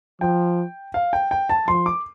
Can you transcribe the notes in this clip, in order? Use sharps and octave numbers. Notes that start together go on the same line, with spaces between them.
F3 G5
F5
G5
G5
A5
F3 C6
D6